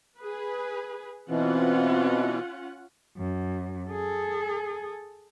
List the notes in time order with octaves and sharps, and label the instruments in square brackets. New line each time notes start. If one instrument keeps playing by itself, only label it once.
[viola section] G#4 B4
[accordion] B2 E3 [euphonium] C4 [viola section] C#4 F4 F#5
[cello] F#2
G#4 A4